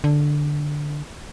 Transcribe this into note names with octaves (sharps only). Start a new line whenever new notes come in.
D3